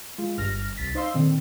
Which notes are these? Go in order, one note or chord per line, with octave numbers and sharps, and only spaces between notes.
G#3 F4
G1 G2 F6 A#6
C2 A6 B6
D#4 C5 D#5 F5 C6 E6
A#2 D3 D#3 C4